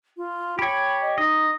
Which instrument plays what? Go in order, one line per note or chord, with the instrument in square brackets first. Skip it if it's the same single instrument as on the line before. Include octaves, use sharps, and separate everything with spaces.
[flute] F4
[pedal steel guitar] G4 C#5 [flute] B5
[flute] D#5
[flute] D#4 [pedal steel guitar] D#5